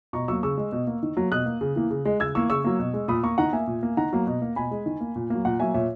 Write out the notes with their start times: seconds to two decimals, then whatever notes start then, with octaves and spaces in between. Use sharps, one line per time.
0.13 B2 A#5 C#6
0.28 F#3 A#3 C#6 E6
0.43 C#3 C#6 E6
0.58 G#3
0.72 B2
0.87 A#3
1.03 D#3
1.17 F#3 A#3
1.32 B2 D#6 F#6
1.46 A#3
1.61 C#3
1.76 E3 A#3
1.91 C#3
2.05 G#3
2.20 C#3 E6 G#6
2.35 E3 A#3 C#6 E6
2.50 C#3 C#6 E6
2.64 F#3 A#3
2.79 B2
2.94 G#3
3.08 A#2 B5 D#6
3.23 A#3 A#5 C#6
3.38 D#3 F#5 A#5
3.53 A#3 E5 G#5
3.67 A#2
3.83 A#3
3.97 D#3 F#5 A#5
4.12 F#3 A#3
4.27 B2
4.42 A#3
4.56 B2 G#5 B5
4.71 G#3
4.86 D#3
5.01 A#3
5.16 A#2
5.30 F#3 A#3
5.45 A#2 F#5 A#5
5.59 F#3 A#3 E5 G#5
5.74 A#2 C#5 E5